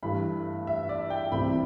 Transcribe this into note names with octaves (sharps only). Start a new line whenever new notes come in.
G2 E3 A3 B5
E5
D5
G5
C2 C3 E3 A3 C4 B5